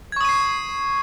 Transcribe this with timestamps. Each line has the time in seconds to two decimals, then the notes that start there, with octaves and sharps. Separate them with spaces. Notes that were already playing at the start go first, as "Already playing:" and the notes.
0.12 G#6
0.16 C#6
0.21 D#6
0.25 D#7
0.29 C7